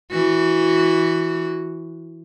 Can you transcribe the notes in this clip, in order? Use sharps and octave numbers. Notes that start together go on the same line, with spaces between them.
E3 F#4